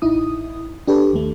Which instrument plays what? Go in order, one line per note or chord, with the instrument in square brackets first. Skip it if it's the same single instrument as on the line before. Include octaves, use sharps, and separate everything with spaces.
[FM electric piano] A1 D#4 E4 D#6
D4 G4 A4 B4
D#2 A3